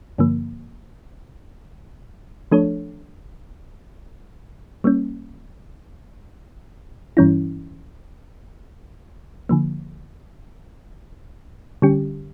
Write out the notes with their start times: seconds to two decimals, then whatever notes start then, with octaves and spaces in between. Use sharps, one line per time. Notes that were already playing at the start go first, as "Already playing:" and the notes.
0.18 G2 D3 F3 A#3
2.51 F3 A3 D4 A4 C#5
4.84 G3 A#3 C#4
7.17 G2 E3 G3 C#4 E4
9.49 D3 F3 A#3
11.82 D3 G3 C#4 G4